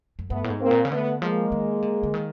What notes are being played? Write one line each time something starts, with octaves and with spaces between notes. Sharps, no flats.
F#2
G2 A3 B3
A2
G#2
A#3 C4
A#2
C#3
D3 A3 B3
F3 G#3 A#3
D#3
D3
D3
D#3